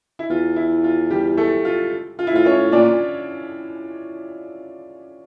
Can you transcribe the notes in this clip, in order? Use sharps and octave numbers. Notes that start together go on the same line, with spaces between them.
E4
E2 F4
E4
F4
G3 G4
A3 A4
F4
F4
E4
A2 F4
C#4 C#5
A#2 D4 D5